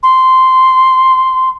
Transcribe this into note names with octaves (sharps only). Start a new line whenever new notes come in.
C6